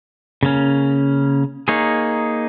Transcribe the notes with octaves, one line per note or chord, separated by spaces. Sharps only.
C#3 A#3 C#4
A#3 D#4 G#4 C#5